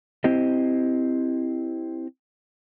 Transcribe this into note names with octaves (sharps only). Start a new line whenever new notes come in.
C4 E4 G4 C5 D#5